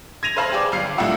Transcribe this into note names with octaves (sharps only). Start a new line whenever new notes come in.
G#6 A#6 D#7 F7
B4 C5 F5 A5 B5
G4 G#4 D5
G1 F5 C7
C2 A3 D4 F4 F#5 E6